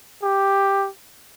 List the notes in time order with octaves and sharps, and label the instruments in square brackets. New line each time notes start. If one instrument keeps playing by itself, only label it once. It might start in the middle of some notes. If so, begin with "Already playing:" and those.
[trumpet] G4